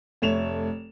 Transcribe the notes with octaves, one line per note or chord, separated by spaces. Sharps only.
F1 A3 C#5 E7 F7